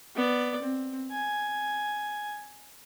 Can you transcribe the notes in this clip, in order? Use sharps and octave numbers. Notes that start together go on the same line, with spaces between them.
B3 D5
C4
G#5